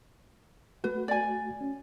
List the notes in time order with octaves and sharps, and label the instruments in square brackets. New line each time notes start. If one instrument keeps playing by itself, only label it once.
[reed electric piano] A3 F#4 [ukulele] B4
[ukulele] D5 G#5
[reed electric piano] C#4